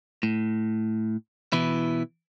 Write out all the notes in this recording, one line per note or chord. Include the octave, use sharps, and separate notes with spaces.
A2
B2 E3 E4